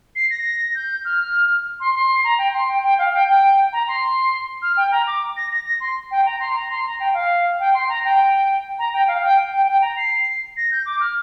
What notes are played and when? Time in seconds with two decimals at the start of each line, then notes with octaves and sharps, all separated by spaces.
0.16 C7
0.30 A#6
0.75 G6
1.05 F6
1.80 C6
1.95 C6
2.24 A#5
2.38 G5
2.54 C6
2.68 G5
2.84 G5
2.98 F5
3.13 G5
3.29 G5
3.73 A#5
3.88 C6
4.62 F6
4.77 G5
4.92 A#5
5.07 D6
5.37 A#6
5.52 A#6
5.65 A#6
5.81 C6
6.11 G5
6.26 A#5
6.40 C6
6.55 A#5
6.70 C6
6.85 A#5
7.00 G5
7.14 F5
7.60 G5
7.74 C6
7.89 A#5
8.04 G5
8.79 A#5
8.93 G5
9.08 F5
9.23 G5
9.52 G5
9.67 G5
9.82 A#5
9.97 C7
10.57 A#6
10.71 G6
10.86 D6
11.00 F6